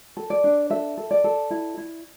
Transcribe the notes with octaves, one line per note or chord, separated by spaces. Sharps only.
A4
D5
D4
A4 E5
A4
D5
A4
E4
E4